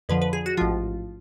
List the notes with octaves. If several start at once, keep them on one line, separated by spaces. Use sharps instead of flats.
F2 D3 F3 B4
B4
G#4
F#4
A1 G#2 F3 F4